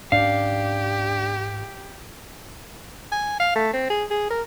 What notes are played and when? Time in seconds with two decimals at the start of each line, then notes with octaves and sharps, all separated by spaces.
0.12 G#2 C#4 D4 G4 F5
3.12 G#5
3.40 F5
3.56 A3
3.74 C4
3.90 G#4
4.10 G#4
4.30 A#4